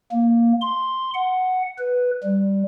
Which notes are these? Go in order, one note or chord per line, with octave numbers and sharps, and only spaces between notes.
A#3
C6
F#5
B4
G3